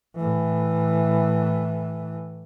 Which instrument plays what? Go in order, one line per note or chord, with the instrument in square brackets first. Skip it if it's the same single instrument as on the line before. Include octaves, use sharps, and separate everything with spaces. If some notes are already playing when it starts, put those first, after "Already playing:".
[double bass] A2 E3